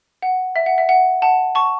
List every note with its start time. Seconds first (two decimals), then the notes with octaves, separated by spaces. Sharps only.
0.22 F#5
0.56 E5
0.66 F#5
0.78 E5
0.89 F#5
1.22 F#5 A5
1.55 A5 C#6